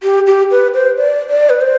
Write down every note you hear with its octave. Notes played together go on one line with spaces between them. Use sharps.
G4
G4
B4
C5
D5
D5
B4
C5